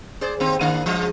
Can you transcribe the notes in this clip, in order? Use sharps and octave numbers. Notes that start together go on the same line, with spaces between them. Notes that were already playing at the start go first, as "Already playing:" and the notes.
G#4 C5 D5
D#2 C4
D#3 A#3 D4
F3 G#3